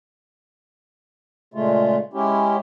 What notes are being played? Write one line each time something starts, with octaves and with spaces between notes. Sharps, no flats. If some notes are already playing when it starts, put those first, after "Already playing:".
A#2 C#3 G#3 A3 F4
G#3 C#4 E4 G4